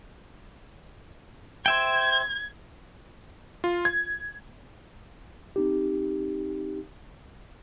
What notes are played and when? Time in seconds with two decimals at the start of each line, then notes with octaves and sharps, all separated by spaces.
1.66 C5 E5 G5 G#6
3.64 F4
3.85 G#6
5.56 C4 D#4 G4